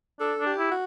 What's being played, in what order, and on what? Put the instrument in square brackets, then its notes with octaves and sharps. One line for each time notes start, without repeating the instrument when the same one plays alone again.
[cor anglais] D4 [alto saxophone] A4
[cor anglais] D4
[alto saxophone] G4
[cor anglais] E4
[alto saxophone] F#4